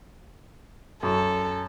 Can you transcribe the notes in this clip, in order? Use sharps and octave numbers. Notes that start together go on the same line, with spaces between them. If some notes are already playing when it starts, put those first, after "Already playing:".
F#2 A4 C#6